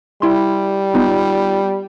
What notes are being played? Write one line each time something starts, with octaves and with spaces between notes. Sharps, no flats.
G3 E4 C6
B3 D#4 F4